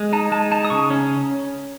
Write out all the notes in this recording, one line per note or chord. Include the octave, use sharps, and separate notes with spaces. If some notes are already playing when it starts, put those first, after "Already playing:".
Already playing: G#3
D#4 A5
G#3 A5
D#4 A5
D#6
C#3 C#6
C#4